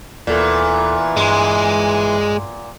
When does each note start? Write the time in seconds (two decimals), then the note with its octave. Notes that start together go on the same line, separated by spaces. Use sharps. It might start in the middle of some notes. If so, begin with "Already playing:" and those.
0.27 D#2 A#2 E3 B3 A4
1.17 G2 G#3 C6